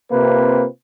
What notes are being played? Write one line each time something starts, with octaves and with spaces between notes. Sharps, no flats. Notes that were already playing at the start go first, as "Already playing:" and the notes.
C3 A#3 C4 F4 B4